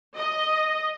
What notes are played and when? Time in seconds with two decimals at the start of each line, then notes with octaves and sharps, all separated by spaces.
0.15 D#5